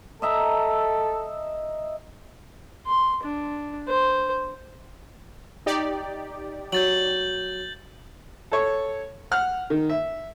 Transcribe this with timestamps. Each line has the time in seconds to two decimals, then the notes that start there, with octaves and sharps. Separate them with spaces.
0.22 A4 D#5 E5 A#5
2.86 C6
3.24 D4
3.88 C5
5.66 D#4 G4 D5
6.72 F#3 G6 A6 F#7
8.51 A4 C#5
9.31 F#5 F6
9.70 D#3
9.89 E5